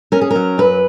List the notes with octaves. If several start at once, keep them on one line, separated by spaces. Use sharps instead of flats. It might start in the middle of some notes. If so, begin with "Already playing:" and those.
C#4 A#4
G#4
A#4
F#3
F#2 B4